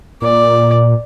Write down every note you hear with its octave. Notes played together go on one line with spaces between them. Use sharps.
A#2 D5